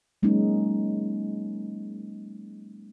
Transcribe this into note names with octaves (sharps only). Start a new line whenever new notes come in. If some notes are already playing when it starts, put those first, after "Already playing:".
F#3 G#3 A#3 C#4 D#4